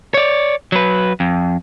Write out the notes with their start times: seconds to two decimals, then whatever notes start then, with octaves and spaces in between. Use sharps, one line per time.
0.14 C#5 D5
0.72 F#3 B4
1.20 F2